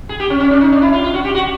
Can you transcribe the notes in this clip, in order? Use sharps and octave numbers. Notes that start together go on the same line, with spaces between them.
G#4
G4
C#4
C#4
D4
D#4
D4
E4
F4
F4
F#4
G4
F#4